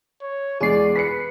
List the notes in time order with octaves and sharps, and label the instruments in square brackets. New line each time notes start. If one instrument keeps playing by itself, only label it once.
[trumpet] C#5
[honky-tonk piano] E2 G#3 [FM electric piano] G#4 C7 [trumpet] D5
[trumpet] B4 [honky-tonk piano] B6 C#7